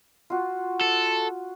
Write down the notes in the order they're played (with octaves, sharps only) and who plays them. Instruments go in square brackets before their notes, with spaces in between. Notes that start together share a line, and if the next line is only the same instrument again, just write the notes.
[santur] F4 F#4
[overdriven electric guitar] A4